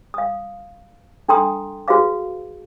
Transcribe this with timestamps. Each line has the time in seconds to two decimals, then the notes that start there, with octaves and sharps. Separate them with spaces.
0.14 F5 D#6
1.29 D4 A4 G5 A#5 C6 D#6
1.88 F#4 G#4 B4 F5 D6